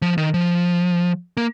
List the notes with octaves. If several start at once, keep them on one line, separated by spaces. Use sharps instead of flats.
F3
D#3
F3
A#3